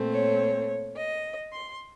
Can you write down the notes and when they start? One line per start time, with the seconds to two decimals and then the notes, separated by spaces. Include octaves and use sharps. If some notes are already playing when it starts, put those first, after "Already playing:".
Already playing: A#2 A3 C4
0.12 C#5
0.97 D#5
1.53 C6